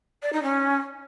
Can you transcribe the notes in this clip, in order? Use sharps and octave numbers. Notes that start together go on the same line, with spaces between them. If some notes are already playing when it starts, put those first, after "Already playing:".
D5
D#4
C#4